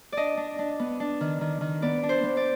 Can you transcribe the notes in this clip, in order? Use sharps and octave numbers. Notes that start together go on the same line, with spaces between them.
D4 D5 D#5
D4
D4
B3
D4
D#3
D#3
D#3
B3 D5
D4
C5
B3
D5